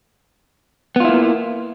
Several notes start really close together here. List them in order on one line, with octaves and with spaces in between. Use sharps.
B3 F4 E4 A#3